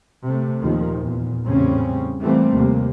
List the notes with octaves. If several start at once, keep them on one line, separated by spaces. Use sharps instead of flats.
C3 A3
D#2 A#2 D#3 F3
E2 A#2
E2 A2 C#3 G3 C4 C#4
E3 G3 A3 A#3 C4
D#2 C3 A#3